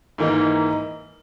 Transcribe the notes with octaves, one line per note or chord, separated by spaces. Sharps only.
G#2 E3 A#3 D#4